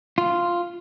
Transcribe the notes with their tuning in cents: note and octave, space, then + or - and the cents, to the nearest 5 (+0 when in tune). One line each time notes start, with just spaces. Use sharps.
F4 -5